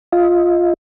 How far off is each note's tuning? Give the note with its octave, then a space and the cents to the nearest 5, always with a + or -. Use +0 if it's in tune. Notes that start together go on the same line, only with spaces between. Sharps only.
F4 +0 D#5 +25